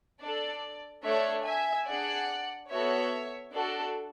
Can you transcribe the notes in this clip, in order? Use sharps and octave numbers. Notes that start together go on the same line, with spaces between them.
D4 A4 D5
A3 D4 A4 C#5 E5
E5 G#5
D4 G#4 D5 F#5
B3 F#4 A4 C#5 E5
D4 F#4 A4 D5